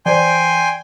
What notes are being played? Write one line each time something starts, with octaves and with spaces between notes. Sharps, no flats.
E3 C5 D5 G5 G#5 C6